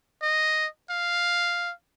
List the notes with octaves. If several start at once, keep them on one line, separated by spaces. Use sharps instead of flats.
D#5
F5